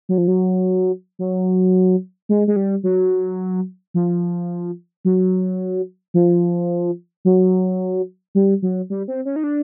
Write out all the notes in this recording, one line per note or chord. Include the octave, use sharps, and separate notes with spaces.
F#3
F3
F#3
F#3
G#3
G#3
G3
F#3
F3
F#3
F3
F#3
G3
F#3
G3
C4
C#4
D#4
D4